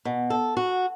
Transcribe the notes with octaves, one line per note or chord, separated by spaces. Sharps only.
B2
A4
F#4